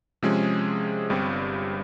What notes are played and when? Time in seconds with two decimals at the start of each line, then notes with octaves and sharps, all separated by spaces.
0.22 C3 F3 G#3 C#4 G#4
1.10 G1 G2 G3 C4